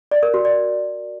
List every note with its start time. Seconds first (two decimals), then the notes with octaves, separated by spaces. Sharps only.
0.11 D5
0.23 A#4
0.34 F#4
0.45 D5